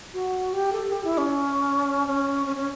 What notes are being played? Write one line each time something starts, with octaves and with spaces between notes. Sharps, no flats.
F#4
G4
A4
G4
E4
C#4
C#4
C#4
C#4